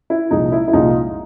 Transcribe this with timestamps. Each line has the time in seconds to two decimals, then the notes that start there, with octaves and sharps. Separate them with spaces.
0.10 E4
0.31 C2 A#2 F3 G#3 D#4
0.52 E4
0.68 E4
0.73 C2 A#2 F3 G#3 D#4 F4